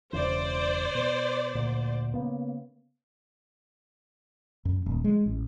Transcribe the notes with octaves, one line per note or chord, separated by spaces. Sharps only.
E1 C#3 E3 C5 D5
B2
D2 A#2
C#3 A#3 B3
F#2
D#1
G#3
A1